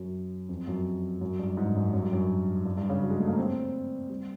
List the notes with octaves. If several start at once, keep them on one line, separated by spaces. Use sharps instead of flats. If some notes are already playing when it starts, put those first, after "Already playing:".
Already playing: F#2
F2
F#2
F#2
G2
G#2
F#2
F#2
G2
F#2
G2
G2
C#3
F#3
G#3
A3
A#3
C4
G3